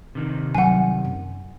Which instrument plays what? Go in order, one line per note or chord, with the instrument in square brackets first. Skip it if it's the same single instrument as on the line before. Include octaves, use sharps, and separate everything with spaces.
[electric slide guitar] C3 D#3
[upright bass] F#3 G3 [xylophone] F#5 G#5
[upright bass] F#2